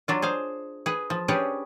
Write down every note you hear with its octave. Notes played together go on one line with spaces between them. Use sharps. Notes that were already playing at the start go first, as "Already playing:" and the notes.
F#3 D4 F4
G#4 C5 F5
G#4 B4
F3
C#4 D4 G4 G#4 B4 C#5